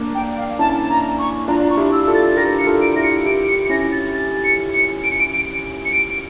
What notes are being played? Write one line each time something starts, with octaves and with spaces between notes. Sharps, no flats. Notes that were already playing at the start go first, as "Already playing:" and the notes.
Already playing: A#3 D4
G5
F5
C#4 E4 A5
A#5
C#6
D4 F4 A#5
A#5
C#6
E4 G4
E6
F4 A4
A6
G4 A#4 A#6
C#7
F4 A4
D7
E4 G4 A#6
C#7
E4 G4 D7
C#7
C#7
C#4 E4 A#6
A6
A6
C#7
C#7
D7
C#7
D7
D7
C#7
D7